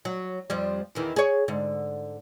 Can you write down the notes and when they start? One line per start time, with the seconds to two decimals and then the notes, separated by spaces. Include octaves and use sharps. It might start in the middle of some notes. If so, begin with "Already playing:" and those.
0.05 F#3
0.50 F2 F3 G3
0.95 E2 D#3 E3
1.16 G#4 C#5
1.48 G#2 D3